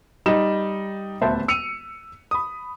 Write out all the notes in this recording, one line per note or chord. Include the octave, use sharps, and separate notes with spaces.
G3 D#4 E7
D#1 D2 B3 C5 E5 A5
E6 C#7 D#7 F7
B5 D#6